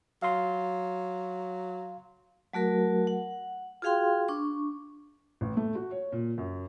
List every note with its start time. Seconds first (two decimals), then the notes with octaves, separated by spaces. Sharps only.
0.22 F#3 F5 C6
2.53 F#3 A3 F#4 A#4
3.07 F#5
3.82 F4 F#4 G#4 F5 G5 C6
4.28 D4 C#6
5.41 A1
5.57 A3
5.75 F#4
5.91 C#5
6.12 A#2
6.38 F#2